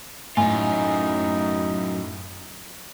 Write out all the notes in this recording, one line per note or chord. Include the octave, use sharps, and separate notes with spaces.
F#2 A2 D#4 F4 G#5